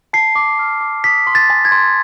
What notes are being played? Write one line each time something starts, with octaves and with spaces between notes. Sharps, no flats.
A5 C7
D6
F6
D6
D#6 B6
C6
A6
G#5
G#6
C6